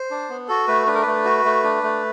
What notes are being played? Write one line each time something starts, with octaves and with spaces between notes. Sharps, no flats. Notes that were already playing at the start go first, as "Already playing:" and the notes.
Already playing: C5
D4
B3
F#4 A4
A3 B4
D4 B4
A#4
B4
A3
F#4
A3
D4
A3